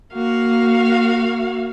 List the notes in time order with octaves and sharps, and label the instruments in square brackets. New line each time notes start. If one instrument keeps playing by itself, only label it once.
[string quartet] A#3 F#4 F5